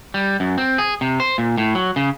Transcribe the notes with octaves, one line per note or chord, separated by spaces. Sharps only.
G3
F#2
C4
G#4
C3
C5
A#2
A2
F#3
C#3